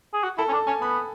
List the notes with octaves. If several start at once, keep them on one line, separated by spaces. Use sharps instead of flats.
G#4
F#4
E4 A4
C#4
D4 A4
C#4 G#5
B3 B5